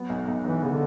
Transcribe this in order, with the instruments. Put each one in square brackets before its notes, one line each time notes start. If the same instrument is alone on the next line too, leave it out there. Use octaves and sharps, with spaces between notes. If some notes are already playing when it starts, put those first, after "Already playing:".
Already playing: [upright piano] F#3 B3
B1
B1
[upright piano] B1 [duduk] E3
[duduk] C#3 [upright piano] B3
[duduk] D3